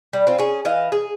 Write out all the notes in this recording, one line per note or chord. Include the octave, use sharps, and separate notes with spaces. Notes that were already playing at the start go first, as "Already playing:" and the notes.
G3
C4 F4
C#4 G#4
E3 D#5 F5
G#4